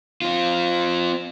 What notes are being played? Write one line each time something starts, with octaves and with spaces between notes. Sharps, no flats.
C4 F4